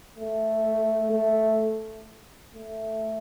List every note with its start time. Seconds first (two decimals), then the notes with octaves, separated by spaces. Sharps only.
0.15 A3
1.11 A3
2.55 A3